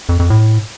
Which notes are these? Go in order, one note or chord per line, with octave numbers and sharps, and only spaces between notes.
F2
F2
A2